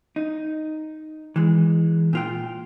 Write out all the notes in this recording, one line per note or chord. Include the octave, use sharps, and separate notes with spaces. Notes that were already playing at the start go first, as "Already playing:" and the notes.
D#4
E3 G#3
A#2 F4 G5